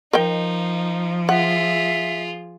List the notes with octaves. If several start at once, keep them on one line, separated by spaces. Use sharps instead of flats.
F3 D#4 A#4 D#5 G5
F4 G#4 E5 F#5